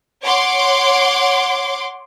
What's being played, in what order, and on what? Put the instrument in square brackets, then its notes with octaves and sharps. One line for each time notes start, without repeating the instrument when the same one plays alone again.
[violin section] C#5 F#5 C6 D6